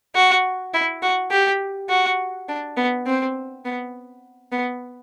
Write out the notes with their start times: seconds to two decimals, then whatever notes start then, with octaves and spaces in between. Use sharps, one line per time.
0.15 F#4
0.74 E4
1.02 F#4
1.31 G4
1.90 F#4
2.49 D4
2.77 B3
3.06 C4
3.65 B3
4.52 B3